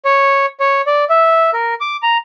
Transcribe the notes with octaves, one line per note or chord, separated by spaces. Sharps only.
C#5
C#5
D5
E5
A#4
D6
A#5